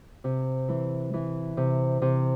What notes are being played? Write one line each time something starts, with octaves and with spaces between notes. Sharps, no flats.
C3
E3
E3
C3
C3